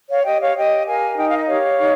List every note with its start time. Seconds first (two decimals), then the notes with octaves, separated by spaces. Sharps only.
0.09 C#5 F5
0.24 G4 D#5 G5
0.41 C#5 F5
0.55 G4 D#5 G5
0.86 A#4 F5 G#5
1.17 D#4 G5
1.28 F5
1.37 D#5
1.47 G4 C#5 F5
1.79 D#4